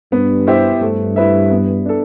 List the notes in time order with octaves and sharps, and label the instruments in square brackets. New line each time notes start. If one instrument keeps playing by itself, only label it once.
[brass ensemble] G2 [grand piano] B3
[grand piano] E4 G4 C5 E5
[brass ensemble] G2 [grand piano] A3
[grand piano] E4 B4 E5
B3
D4 A4